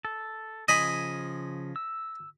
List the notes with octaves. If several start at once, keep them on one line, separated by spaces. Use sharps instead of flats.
A4
C#3 F3 D#5 G#5 B5
E6